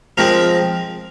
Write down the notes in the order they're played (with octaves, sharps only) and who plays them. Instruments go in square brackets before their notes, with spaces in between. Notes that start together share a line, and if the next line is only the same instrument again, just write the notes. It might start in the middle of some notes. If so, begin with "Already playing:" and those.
[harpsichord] F3 G#3 C4 A#4